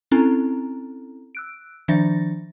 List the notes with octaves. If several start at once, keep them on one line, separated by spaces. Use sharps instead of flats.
C4 C#4 E4 A4 G#5 A#5
E6 F#6 D7
D#3 F3 D4 E5 A6 A#6